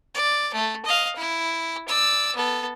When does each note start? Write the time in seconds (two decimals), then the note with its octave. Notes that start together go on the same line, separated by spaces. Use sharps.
0.15 D5
0.54 A3
0.85 D#5 F5
1.16 E4
1.88 D5 E6
2.36 B3 A4